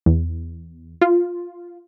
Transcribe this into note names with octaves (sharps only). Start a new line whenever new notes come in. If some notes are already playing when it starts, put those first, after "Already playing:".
E2
F4